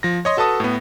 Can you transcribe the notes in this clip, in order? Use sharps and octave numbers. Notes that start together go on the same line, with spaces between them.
F3 A#6
C#5 D#5 C6
F#4 A4 B4 A5 D#6
A2 B3